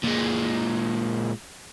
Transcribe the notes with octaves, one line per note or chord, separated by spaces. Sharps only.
A#2 G#3